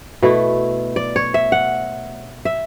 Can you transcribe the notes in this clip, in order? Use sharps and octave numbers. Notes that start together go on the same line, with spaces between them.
B2 A3 E4
D5
C#5
E5
F#5
E5